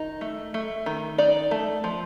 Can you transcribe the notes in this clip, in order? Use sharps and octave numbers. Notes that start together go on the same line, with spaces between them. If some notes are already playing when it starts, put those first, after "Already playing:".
Already playing: D#3 D#4
A3
A3
D#3
D#4 D5
A3
F3